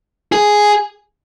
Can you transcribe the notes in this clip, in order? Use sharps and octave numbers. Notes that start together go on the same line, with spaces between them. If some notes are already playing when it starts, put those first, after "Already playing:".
G#4